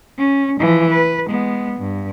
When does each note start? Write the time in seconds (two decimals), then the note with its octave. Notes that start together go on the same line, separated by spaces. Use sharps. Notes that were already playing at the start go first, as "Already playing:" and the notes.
0.18 C#4
0.60 E3 F3
0.90 B4
1.27 G#3 B3
1.80 G2